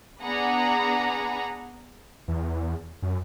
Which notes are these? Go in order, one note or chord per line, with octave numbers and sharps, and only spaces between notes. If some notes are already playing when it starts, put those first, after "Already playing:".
B3 D4 G#4 F#5 A#5 B5
E2
F#2